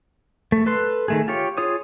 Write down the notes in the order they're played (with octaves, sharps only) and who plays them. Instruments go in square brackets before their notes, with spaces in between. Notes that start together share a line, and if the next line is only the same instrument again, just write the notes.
[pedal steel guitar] A3
A4 B4 C6
D#3 A3 G#4
F4 G4 C#5
F4 G#4 C#5 D#6